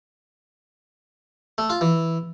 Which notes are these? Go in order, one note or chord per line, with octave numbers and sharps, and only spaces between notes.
A3
F4
E3